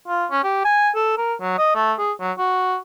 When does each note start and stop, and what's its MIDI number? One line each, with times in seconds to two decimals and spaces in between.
0.08 0.26 65
0.31 0.41 61
0.44 0.62 67
0.65 0.90 80
0.95 1.14 69
1.18 1.34 70
1.41 1.55 54
1.58 1.74 75
1.75 1.93 57
1.98 2.12 68
2.20 2.32 54
2.38 2.76 66